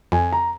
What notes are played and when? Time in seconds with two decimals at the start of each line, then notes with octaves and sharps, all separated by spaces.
0.12 F2 G#5
0.32 A#5